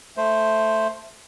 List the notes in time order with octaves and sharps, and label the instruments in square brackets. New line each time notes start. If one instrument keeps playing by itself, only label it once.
[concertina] A3 C5